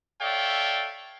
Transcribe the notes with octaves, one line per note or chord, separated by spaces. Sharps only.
A4 C#5 D5 E5 F5 G5